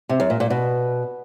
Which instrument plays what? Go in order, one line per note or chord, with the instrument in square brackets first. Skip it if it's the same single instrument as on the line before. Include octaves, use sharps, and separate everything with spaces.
[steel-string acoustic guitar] C3
F#2
A#2
A#2
B2